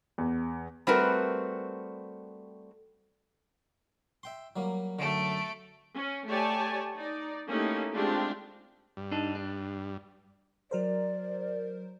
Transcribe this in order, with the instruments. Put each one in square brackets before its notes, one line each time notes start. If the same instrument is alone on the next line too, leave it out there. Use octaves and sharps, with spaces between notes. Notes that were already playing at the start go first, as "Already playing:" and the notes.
[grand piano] E2
[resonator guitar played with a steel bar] G3 A3 C4 F#4 A#4 B4
[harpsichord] E5 G5 C6
F#3 G3 A#3
[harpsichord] F#2 D3 [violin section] A3 D7
[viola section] C#4
A3 G4 C#5 D5 G#5 A5
D#4 D5
A3 A#3 C#4 D#4 E4 G4
G#3 A3 C4 D4 F4 G4
[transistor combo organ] G2
[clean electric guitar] D4 D#4 A4
D4
[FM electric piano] F#3 A#4 C5 [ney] D5